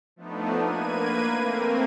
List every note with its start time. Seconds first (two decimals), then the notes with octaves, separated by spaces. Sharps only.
0.16 F3 A3 B3 D4 D#4
0.62 A#3 B4 G#6 D#7
1.38 A3 A#3 C4